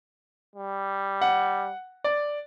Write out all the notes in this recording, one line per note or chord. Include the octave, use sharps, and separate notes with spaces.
G3
F#5
D5